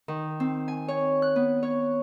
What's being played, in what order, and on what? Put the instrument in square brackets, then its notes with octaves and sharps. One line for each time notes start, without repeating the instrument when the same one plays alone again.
[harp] D#3
C4
G#5
C#5
F#6
B3
C#5